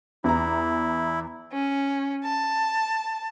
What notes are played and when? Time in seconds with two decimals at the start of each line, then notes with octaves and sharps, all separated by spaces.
0.24 E2 E4 A#5
1.53 C#4
2.23 A5